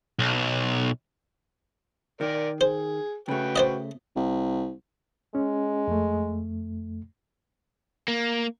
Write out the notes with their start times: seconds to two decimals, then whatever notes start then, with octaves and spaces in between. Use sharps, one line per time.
0.19 B1
2.21 D#3 A#4 D5
2.61 G#4 C5
3.28 C#3 A3 F#4 B4 G5
3.56 C5 D5 D#5
4.16 C2
5.35 G#3 C#4
5.88 F2 A3
8.08 A#3